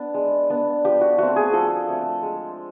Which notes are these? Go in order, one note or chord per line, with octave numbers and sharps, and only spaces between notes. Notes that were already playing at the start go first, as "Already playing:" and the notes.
Already playing: B3 D4
G#3
B3 D4
F3 G4
F#4
A3 C4 F#4
G#4
F3 A4
A3 C4
G#3